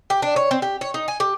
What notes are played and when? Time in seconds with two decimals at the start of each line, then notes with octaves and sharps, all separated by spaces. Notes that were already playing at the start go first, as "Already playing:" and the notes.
0.10 G4
0.22 D4
0.36 C#5
0.51 C4
0.62 G4
0.81 C#5
0.94 D#4
1.08 G#5
1.20 G4